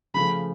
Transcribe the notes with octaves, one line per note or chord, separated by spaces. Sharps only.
C#3 F3 A3 B5